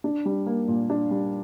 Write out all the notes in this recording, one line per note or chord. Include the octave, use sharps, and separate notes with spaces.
D4
G3
A#3
A#2
D4
G3